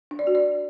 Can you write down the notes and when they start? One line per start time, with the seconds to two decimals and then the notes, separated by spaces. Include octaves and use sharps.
0.11 D4
0.19 D5
0.27 F#4
0.35 D5